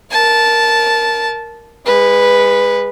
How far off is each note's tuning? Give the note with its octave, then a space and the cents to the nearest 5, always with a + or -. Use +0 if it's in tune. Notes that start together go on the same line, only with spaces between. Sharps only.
A#4 +0 A5 -10
G#3 -25 B4 +0